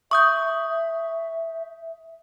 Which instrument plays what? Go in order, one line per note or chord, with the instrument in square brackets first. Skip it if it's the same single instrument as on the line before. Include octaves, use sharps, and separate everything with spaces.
[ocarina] E5 [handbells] C#6 D#6 G6